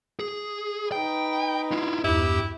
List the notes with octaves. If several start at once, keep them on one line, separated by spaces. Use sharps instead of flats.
G#4
D#4 B4 G5
E4 F4
E2 G2 E4 G4